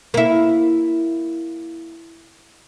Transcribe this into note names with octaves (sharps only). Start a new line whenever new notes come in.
A#3 E4